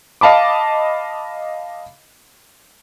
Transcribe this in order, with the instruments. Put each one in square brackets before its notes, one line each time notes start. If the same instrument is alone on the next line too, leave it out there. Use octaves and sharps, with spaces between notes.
[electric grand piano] D#5 F5 A5 B5 D6